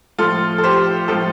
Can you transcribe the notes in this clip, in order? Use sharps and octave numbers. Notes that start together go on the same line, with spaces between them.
A2 F3 F4 A4
A4
G4 C5
A2 F3 F4 A4